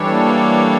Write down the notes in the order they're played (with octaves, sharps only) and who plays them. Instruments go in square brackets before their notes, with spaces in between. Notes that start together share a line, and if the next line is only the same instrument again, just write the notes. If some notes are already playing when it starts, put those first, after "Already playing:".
Already playing: [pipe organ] E3 G3 D4 A4 C#5
[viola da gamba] A#3